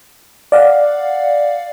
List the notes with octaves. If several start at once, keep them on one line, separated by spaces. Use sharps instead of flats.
D5 F5 F#5